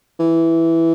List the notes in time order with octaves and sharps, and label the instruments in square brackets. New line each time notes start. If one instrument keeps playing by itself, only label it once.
[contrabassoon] E3